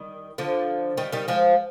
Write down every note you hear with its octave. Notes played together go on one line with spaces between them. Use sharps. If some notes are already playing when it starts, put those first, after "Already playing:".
Already playing: D#3 G3
D3 F3
D#3 G3
D#3 G3
F3 G#3